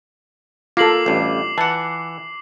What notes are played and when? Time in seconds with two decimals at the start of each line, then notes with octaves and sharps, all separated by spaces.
0.77 A#3 F4 A4 D6 C7 F#7
1.06 A1 G2
1.58 E3 F#5 A5